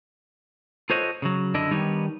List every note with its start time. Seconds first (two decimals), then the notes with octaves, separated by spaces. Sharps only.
0.90 F4 A4 C5 C#5 D#5 F#5
1.22 C#3 F#3
1.54 F#2 D3 D4 E4 D#5 E5
1.71 D#3 G3 B3 D4 D#4 C#5